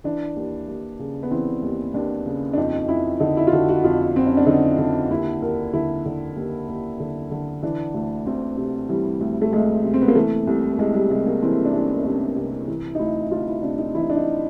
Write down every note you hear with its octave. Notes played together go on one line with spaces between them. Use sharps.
E3 D4
D#2
D#2
C#3
B3
E3 C4
D#2
D#2 D4
C#3
D4
F2 D#4
F2 E4
D3 D#4
E4
F4
D3 F#4
F#4
F2 F4
F2 C4
C#4
D4
D3 D#4
D3
D#2 E4
D#2 A#4
D3 E4
D3
D#2
D#2
D3
D3
E3 D4
D2
D2 C4
C3
E3 G3
D2
A3
D2 G#3
C3
C4
B3
A#3
E3 A3
C2
C2 G#3
G3
C3 G#3
A#3
E3 C4
D4
C2 C#4
C#4
C2 D4
C3
E3
D#4
D2 E4
D2 F4
E4
C3 D4
D#4
E3 E4
D#4
D4
D#4